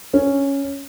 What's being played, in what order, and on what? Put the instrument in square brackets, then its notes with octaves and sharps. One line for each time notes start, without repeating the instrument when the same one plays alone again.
[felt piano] C#4